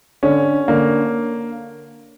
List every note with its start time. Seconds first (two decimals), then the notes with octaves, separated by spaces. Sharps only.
0.23 D3 C#4
0.68 D3 A#3